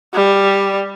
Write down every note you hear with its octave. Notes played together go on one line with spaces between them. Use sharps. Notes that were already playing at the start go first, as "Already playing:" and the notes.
G3